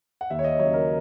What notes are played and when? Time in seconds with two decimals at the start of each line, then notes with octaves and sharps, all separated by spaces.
0.21 F#5
0.30 D#2 E5
0.39 C#5
0.44 D#5
0.59 C#3 F#3 C#5
0.74 A#4